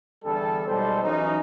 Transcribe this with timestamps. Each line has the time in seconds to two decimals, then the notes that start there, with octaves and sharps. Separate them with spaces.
0.24 E2 D3 G3 A4
0.67 B1 G3 G#3 A4 C5
1.03 E3 F#3 C#4 D#4